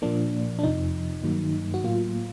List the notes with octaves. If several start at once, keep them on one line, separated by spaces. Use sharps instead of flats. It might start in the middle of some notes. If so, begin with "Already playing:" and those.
A#2 F3 A#3 D4
D4
F2 C3 F3 D#4
G2 D#3 F#3 A#3
F#4
A2 F#3 A#3 F4